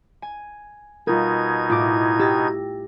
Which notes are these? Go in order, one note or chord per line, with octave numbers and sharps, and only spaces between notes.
G#5
B2 G3 D#4 F4 A#4 G#6
A2 F4 D6
G4 E6 A6 A#6